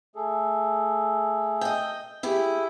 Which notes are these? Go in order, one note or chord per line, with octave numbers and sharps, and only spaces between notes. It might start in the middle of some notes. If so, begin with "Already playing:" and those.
A3 G#4 A4
D#5 G5
E4 G4 G#4 E5